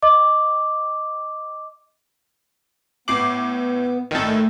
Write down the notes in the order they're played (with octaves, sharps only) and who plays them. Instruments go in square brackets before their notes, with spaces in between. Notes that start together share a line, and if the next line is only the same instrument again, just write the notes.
[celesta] D#5 D6
[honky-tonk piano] A2 C7 F#7 [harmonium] B3 [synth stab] D6
[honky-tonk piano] A#1 A2 [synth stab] D#3 A4 [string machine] A3